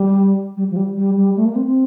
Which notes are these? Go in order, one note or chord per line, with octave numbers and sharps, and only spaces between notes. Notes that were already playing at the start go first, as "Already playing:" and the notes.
Already playing: G3
G3
F3
G3
G3
G3
A3
A#3
C4
C4